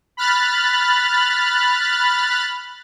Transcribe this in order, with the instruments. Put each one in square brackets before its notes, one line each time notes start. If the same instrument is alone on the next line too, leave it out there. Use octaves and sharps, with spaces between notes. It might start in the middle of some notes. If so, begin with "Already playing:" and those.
[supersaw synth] B5 F6 F#6 A6